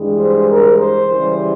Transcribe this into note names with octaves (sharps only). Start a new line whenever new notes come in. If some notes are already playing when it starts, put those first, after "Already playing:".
Already playing: G2 E3 G#3
C5
A#4
C5
C#3 E3 G3